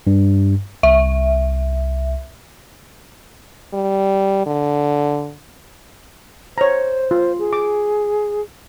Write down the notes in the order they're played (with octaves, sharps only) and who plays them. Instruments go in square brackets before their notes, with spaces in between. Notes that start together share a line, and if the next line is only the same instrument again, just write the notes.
[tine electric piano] G2
[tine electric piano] C2 [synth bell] E5
[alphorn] G3
D3
[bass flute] C5 [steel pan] C#5 A#5
[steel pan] F4
[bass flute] G#4
[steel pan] D6